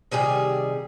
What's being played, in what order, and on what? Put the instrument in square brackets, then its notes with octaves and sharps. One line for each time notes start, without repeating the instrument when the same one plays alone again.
[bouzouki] C3 D#3 G3 G#4